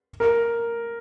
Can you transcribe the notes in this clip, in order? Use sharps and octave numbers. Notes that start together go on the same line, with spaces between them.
A#4